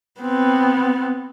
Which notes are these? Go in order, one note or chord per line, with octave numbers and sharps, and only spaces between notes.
B3 C4